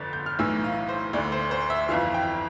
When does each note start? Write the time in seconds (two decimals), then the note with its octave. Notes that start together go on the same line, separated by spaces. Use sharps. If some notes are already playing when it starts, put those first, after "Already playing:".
Already playing: G1 F2 D3 A6
0.13 G6
0.26 F6
0.39 B1 A2 E3 E6
0.64 F5
0.89 C5
1.13 D2 D3 D5
1.32 C5
1.51 C5
1.70 E5
1.89 G1 F2 E3 F5
2.14 G5